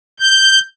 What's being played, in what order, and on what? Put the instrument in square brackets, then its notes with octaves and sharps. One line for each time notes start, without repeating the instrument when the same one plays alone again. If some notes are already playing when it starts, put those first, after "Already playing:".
[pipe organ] G6